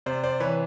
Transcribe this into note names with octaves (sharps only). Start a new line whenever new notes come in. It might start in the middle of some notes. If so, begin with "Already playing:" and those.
C3 C5 D5
C5 D5
E3 B4 C#5